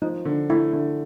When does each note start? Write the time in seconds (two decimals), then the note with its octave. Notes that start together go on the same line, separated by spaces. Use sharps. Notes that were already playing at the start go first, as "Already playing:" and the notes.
0.02 F3 D#4
0.25 D3
0.50 A3 E4
0.73 D3